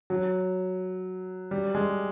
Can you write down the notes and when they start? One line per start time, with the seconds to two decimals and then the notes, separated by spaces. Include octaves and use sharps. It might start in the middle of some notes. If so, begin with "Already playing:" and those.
0.10 F#3
1.51 G3
1.75 G#3